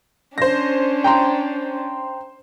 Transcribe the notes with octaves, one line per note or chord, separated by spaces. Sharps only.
C#4 D4 C5 A#6
G5 A#5 C6